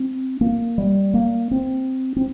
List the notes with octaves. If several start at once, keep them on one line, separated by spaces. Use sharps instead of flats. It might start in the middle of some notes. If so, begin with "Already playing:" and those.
Already playing: C4
A#3
G3
A#3
C4
C4